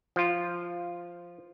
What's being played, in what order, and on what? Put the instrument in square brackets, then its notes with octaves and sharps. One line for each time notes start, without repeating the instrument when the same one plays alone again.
[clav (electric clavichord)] F3 F4